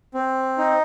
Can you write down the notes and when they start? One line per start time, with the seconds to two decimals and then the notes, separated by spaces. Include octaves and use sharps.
0.14 C4
0.58 D#4